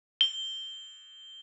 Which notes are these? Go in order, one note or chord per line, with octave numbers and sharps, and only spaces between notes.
G7